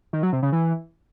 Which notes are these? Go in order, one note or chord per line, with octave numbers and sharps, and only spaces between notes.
D#3
F#3
C3
C#3
E3